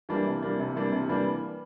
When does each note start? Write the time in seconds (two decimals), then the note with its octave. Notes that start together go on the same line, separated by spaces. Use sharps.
0.09 E3 G3 A#3 D4
0.26 C3
0.42 E3 G3 A#3 D4
0.59 C3
0.76 E3 G3 A#3 D4
0.92 C3
1.09 E3 G3 A#3 D4